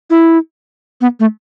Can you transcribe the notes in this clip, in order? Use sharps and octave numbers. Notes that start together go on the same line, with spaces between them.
E4
B3
A3